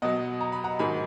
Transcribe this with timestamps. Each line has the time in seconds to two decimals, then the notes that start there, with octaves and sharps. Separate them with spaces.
0.02 B2 F#3 D#5 F#5
0.41 A#5
0.52 B5
0.64 F#5 A#5
0.79 G#2 D#3 F#3 G#5 B5